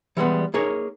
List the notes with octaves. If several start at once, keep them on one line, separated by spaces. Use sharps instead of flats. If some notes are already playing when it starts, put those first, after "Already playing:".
E3 G3 G#3 B3
A#3 D#4 G#4 A#4 C#5